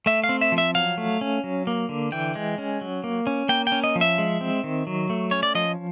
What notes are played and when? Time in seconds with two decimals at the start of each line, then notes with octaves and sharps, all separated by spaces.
0.06 A3 E5
0.24 F5
0.29 C4
0.41 E5
0.52 F3
0.58 E5
0.75 F#3 F5
0.98 A3
1.21 C#4
1.44 F#3
1.67 A#3
1.89 D3
2.12 E3 G5
2.36 G#3
2.58 C#4
2.81 F#3
3.04 A#3
3.27 C#4
3.49 A#3 G5
3.67 G5
3.72 C#4
3.84 D#5
3.96 F3
4.01 E5
4.18 G#3
4.41 C4
4.64 D#3
4.87 F#3
5.10 A3
5.31 C#4 C#5
5.43 D5
5.55 F3 D#5